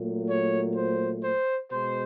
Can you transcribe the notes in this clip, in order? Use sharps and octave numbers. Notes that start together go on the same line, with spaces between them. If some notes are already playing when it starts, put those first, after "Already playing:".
Already playing: A#2 F#3 A3
C#5
C5
C5
B2 G#3 C5